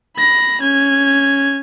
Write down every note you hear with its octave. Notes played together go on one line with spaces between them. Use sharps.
B5 A#6
C#4 G#6